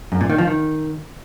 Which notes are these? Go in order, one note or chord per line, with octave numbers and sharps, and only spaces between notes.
F#2
A#2
D#3
F3
D#3